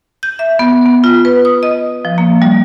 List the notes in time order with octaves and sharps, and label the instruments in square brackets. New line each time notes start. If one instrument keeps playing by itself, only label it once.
[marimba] G6
E5
B3
B3
F4
B4
D#6
D#5
F3
A#3
G3